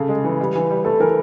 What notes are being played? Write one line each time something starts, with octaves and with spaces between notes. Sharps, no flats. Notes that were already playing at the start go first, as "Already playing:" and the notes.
Already playing: C#3 G#4 A4
G#3
E3
G3
E3
G3
A3 A4
E3 A#4